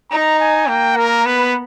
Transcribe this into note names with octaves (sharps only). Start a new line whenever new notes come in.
D#4 A#5
G#5
A#3 G5
A#4
B3 B4